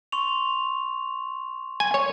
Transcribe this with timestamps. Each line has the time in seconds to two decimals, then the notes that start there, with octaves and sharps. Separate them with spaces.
0.12 C6 C#6 F7
1.80 G#5
1.94 C#5